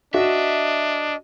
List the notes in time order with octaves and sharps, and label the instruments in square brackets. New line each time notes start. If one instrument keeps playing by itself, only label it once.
[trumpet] D4 [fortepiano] F#4 [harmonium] D#5 [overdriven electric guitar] E5